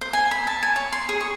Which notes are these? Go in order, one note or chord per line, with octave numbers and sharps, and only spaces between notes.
C5
G#5
B5
A5
G#5
C#5
C6
G#4
C#6